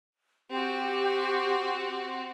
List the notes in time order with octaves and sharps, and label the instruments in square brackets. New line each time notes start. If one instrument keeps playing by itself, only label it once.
[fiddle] C4 F#4 [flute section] G4